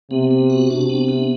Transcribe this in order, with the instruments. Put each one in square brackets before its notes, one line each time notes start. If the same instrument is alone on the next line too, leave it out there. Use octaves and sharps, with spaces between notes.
[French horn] C3 [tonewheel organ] B3
[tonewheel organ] B3
F#4
[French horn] C3 [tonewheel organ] D4
[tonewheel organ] B3
B3